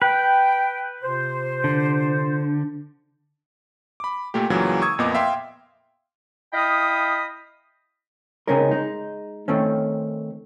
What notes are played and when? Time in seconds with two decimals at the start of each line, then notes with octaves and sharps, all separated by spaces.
0.02 B4 G5
1.03 C3 F4 C5
1.64 D3
4.00 B5 D6
4.34 A#2 A3 A#3 G4
4.50 C#2 A#2 C#3 E3 F#3
4.82 C#6 D#6 E6 G#6
4.98 F2 A#2 B3 D#5 D6 G#6
5.15 E5 F5 G5 C6
6.52 E4 D#5 F5 G5 B5 D#6
8.47 C#3 G#3 C4 C#4 D#4 A#4
8.71 G#3 D#4
9.48 D#3 A3 C4 C#4